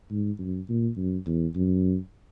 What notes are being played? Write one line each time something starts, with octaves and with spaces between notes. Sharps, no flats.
G#2
F#2
A#2
F#2
E2
F#2